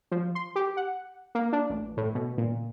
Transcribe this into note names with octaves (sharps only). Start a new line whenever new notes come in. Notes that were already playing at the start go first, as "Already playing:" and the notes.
F3
C6
G4
F#5
A#3
D4
A1
A2
B2
A#2